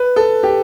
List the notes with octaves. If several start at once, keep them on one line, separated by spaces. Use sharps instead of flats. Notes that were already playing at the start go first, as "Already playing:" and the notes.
Already playing: B4
A4
G4